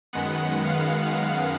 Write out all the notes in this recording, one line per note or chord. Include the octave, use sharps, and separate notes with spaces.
F#2 D#3 G#3 B3 F#5
F5
F5